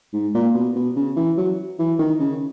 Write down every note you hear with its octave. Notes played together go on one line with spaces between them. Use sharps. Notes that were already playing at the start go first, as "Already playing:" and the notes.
G#2
A#2
B2
B2
C#3
E3
F#3
E3
D#3
C#3